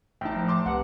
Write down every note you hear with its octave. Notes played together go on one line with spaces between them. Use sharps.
A1 D#4 E5 G5 A5 B5
F3 A3
A5 C6 D6
C2 C4 G4 B4 F#5